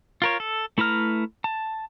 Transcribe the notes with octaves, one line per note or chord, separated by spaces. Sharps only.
F4 A#4 C#5
A4
A3 E4 B4 A#5 F6
A5